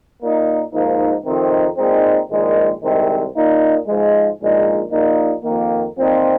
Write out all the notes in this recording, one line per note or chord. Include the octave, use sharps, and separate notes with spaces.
A#2 A#3 D#4
G#2 F3 A#3 D#4
F2 C3 D#3 C4 D#4
A#2 G#3 C4 D#4
A#1 G#2 D#3 G#3
C2 C3 D#3 G#3 C4
A#2 A#3 D#4
G#2 F3 G#3
A#1 A#2 G#3 D#4
A#1 A#2 A#3 D#4
F2 D#3 A#3
A#2 F3 C4 D#4